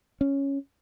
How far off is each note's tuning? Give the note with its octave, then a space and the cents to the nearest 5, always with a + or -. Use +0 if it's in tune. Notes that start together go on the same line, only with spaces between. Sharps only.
C#4 +0